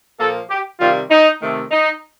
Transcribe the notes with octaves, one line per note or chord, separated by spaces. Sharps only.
A#2 F3 A#3 A4
G4
C3 D#3 G3 F4
D#4
C3 D#3 A3
D#4